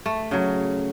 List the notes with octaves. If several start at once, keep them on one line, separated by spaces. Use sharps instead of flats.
A3
C#3 F#3